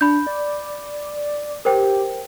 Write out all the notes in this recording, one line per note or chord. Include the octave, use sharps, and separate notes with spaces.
D4 B5 G6
D5
G4 A#4 C5 G5